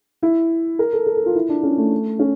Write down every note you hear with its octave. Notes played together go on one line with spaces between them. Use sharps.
E4
A#4
A4
A4
A4
F4
E4
D4
C#4
A3
C#4